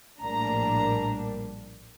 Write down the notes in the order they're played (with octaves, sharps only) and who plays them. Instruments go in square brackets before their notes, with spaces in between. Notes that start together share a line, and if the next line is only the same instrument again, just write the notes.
[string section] A#1 A2 G3 A#3 D4 A#5